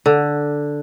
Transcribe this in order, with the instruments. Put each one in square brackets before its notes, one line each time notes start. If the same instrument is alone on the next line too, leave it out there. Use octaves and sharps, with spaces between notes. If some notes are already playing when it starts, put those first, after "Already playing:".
[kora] D3